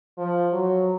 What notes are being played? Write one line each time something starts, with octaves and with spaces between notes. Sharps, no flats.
F3
F#3